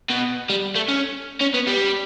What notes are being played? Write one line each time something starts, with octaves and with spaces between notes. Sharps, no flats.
B2
G3
A3
C#4
C#4
B3
G3